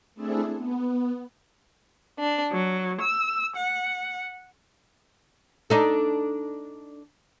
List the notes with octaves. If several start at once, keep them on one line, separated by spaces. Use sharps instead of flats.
A3 C4 D4 E4 G#4 A4
B3
D4
F#3
E6
F#5
D4 D#4 A4